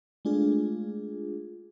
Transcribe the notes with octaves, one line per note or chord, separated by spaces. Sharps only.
G#3 A3 D4 F4 G#4